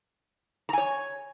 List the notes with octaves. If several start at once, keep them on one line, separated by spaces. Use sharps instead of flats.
C#5 G#5 A#5